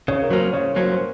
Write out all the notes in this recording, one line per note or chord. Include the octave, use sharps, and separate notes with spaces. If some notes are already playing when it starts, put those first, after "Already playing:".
C#3 C#5
A#4
F#3 A#3 C#4 C5
C#3 C#5
F#3 A#3 C#4 C5
C5